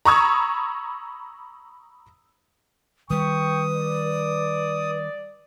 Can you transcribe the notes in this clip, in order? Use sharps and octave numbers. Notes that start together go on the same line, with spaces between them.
A#5 B5 C#6 D#6 E6 G#6
D#3 G3 B4 G5 C#6 D#6
D5